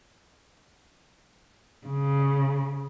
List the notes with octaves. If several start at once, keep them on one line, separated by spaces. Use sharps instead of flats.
C#3